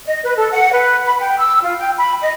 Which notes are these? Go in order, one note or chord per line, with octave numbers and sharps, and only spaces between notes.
D#5
B4
A4
F#5
B4
B5
G5
E6
F4
G5
B5
D#5